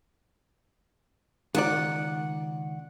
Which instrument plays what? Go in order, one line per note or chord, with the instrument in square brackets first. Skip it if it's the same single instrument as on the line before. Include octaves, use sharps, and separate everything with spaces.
[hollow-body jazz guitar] C#2 D#3 D5 [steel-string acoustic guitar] F#5